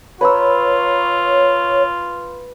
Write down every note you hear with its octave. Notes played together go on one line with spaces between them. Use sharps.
F4 B4 C#5 A#5 E6